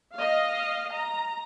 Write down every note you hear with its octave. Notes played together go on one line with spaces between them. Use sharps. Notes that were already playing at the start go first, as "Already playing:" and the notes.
D#5 F5
A#5